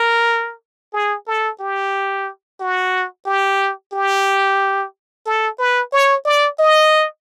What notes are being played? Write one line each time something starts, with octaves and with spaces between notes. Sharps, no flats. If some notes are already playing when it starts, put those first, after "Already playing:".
Already playing: A#4
G#4
A4
G4
F#4
G4
G4
A4
B4
C#5
D5
D#5